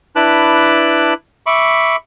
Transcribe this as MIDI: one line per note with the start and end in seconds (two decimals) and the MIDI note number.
0.16 1.14 62
0.16 1.14 64
0.16 1.14 71
0.16 1.14 81
0.16 1.14 86
0.16 1.14 90
1.46 1.96 76
1.46 1.96 83
1.46 1.96 85
1.46 1.96 86